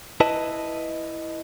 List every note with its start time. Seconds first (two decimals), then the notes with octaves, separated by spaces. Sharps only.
0.20 E4 B4 D#5 A5